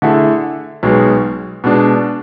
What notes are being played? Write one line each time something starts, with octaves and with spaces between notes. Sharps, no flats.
D3 A3 E4 G#4
B1 B2 G#3
B2 G#3 D4